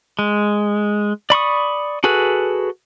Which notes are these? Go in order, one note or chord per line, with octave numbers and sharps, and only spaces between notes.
G#3
D5 B5 C#6 D#6
F#4 G#4 A4 B4